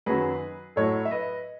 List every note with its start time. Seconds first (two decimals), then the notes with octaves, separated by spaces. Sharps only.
0.06 F#2 D#3 F#3 G#4 B4
0.76 A2 F#3 A4 C#5
1.05 E5
1.11 B4 D#5